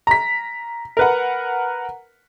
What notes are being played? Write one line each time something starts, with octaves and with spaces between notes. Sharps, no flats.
A#5 B6
A#4 B4 F#5